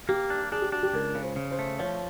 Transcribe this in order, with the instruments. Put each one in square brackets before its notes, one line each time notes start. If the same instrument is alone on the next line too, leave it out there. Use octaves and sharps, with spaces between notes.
[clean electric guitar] A#3 [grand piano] G4
[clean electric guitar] D4
[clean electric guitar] D4 [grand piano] G#4
[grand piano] G4
[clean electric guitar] D4 [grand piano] F#4
[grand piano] G4
[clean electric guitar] C#2 [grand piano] A#4
[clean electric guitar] C#3
[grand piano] C5
[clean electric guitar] C#3
[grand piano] C5
[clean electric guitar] A3
[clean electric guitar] F3 [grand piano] C#5